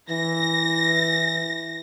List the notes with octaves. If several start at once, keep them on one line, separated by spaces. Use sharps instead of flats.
E3 A#6